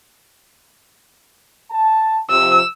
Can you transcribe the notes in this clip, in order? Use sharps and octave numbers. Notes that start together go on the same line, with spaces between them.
A5
C3 F3 E6